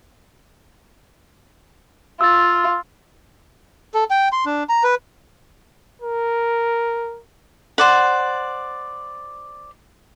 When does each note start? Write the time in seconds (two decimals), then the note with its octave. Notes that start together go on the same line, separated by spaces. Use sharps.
2.21 F4 E6 A6
3.94 A4
4.10 G5
4.32 C6
4.46 D4
4.69 A#5
4.83 B4
6.02 A#4
7.78 C5 D5 F#5